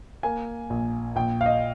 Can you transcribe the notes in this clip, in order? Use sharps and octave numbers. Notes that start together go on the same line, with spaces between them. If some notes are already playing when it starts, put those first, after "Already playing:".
A#3 G#5
A#1
A#1 G5
F5
D#5